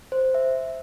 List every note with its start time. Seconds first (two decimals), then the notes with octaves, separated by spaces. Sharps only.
0.12 C5
0.34 E5